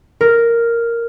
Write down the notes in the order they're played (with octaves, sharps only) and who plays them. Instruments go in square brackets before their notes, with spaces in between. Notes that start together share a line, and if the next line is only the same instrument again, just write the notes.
[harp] A#4